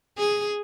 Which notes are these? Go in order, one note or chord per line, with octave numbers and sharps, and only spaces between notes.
G#4